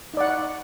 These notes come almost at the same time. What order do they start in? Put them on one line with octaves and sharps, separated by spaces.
D#4 D5 F#5